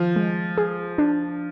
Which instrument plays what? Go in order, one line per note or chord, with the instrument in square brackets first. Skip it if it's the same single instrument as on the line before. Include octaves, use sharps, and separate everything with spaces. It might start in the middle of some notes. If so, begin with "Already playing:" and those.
Already playing: [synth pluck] D#3 [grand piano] F3
[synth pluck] G#3
G#4
D4